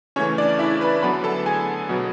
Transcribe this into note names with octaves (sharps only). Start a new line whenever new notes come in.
C#3 E3 A3 C#4 C#5
D4 D5
E4 E5
B4 B5
D3 F#3 B3 B4 B5
A4 A5
G#4 G#5
B2 F#3 B3